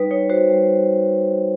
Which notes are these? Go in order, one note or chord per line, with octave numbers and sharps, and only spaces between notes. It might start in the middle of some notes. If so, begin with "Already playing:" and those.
Already playing: G3 D#4 B4
D#4 C#5
F#4 C5
G3